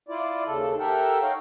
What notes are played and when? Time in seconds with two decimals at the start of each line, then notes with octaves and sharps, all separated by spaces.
0.09 E4 F4 D5
0.46 D#2 C#3 A4
0.79 G4 A4 A#4 E5 F#5 G5
1.22 D#4 C#5 F5 G5